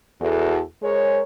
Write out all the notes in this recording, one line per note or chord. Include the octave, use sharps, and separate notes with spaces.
E2 F#4 A4
G#3 G#4 A#4 C5 C#5